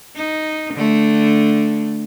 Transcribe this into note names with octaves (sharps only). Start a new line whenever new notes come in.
D#4
D3 A3